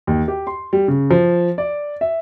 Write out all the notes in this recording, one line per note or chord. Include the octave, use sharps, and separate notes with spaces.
D#2
G4
C6
G3
C#3
F3
D5
E5